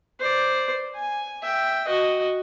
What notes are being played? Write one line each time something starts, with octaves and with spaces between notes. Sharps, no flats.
C5 D5
G#5
E5 G5
F#4 D#5